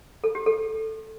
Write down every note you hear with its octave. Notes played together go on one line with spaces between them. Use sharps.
A4
G4
A4